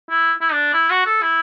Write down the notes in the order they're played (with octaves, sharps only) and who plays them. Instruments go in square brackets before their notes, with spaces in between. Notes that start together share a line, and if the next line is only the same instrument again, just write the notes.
[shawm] E4
E4
D4
E4
F#4
A4
E4